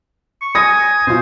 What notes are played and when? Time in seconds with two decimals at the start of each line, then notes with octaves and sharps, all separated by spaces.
0.41 C#6
0.55 G#5 D#6 A#6
1.07 B2 F4 C5